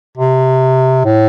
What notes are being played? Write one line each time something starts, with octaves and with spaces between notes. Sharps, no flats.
C3
A2